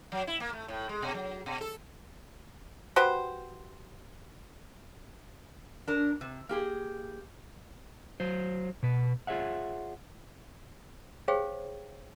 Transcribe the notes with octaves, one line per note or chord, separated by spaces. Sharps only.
F#3
E4
A#3
A3
A2
G#3
B2
F#3
B2
A4
F#4 G4 B4 C5
D4 A#4
C3
A#3 G4 G#4
F#3 C5
B2 B4
F4 G#4 C#5 E5 F#5
G4 G#4 C5 C#5 F5 G5